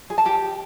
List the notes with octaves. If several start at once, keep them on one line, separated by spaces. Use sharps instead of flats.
G#4
A5
G4